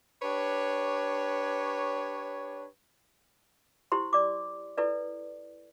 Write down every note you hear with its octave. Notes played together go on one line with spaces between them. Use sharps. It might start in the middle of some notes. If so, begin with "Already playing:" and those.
D4 G4 B4 C#5
E4 G4 C5 C6
D5 D6
E4 A4 B4 D5